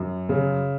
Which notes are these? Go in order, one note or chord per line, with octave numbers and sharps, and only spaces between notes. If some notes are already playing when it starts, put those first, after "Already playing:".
Already playing: F#2
C#3